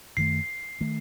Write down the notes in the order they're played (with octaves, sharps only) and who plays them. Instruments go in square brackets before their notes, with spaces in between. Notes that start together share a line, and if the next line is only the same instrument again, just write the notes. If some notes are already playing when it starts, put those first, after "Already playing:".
[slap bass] F#2 D#3 A3 [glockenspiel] C7
[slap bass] D#3 A3